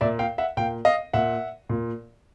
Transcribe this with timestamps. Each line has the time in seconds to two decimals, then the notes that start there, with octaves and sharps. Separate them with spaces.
0.01 A#2 D5 E5
0.19 F5 G5
0.38 E5 F#5
0.57 A#2 F5 G5
0.85 D#5 F5
1.13 A#2 E5 F#5
1.69 A#2